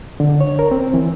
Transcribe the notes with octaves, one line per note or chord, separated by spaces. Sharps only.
D3
C#5
A#4
C4
E3